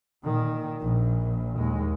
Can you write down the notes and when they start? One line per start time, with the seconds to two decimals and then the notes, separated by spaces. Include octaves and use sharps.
0.23 A#2 D#3
0.81 A#1 A#2
1.58 D#2 G#3